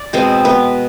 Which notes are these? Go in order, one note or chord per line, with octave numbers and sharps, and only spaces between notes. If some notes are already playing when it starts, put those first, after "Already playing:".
Already playing: D5
B2 G#3 B3 C4 C5
B3 B4